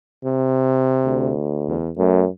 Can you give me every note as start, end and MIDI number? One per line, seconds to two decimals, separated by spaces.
0.25 1.33 48
1.05 1.77 38
1.68 1.91 40
1.98 2.27 42
1.98 2.25 57